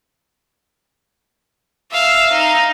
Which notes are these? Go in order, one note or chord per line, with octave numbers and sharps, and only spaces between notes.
E5 F5
D#4